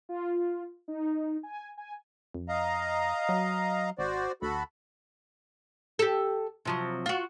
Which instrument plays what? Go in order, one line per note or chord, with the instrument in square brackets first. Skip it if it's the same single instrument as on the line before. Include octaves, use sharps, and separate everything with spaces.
[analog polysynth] F4
D#4
G#5
G#5
[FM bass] F2
[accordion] D#5 F5 A#5
[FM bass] F#3
[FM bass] G#1 [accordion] F#4 C5 D5
[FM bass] D2 [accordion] F#4 A4 B5
[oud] G4 A4
C3 F3 F#3
F4 F#4